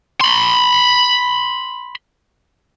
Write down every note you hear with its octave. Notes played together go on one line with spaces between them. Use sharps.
B5 C6